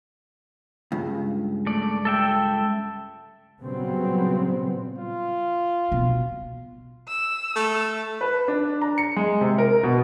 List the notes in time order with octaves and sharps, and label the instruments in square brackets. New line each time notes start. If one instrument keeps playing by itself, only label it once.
[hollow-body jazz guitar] C#2 G2
[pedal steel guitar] A3 D5
A4 E5 G5
[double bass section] A#2 C#3 F#3 G3 B3 C4
[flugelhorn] F4
[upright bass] B2
[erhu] E6
[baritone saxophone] A3
[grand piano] B4
D4
A#5
C#7
G#3
C3
A#4
B2